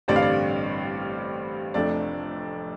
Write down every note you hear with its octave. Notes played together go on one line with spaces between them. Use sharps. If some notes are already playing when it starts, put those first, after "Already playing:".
A1 G2 D3 G3 C4 D5
F5
D5
F1 F2 F3 A3 D4 D5